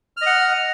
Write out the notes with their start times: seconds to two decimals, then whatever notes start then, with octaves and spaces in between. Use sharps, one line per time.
0.17 F6
0.22 D#5
0.26 F#5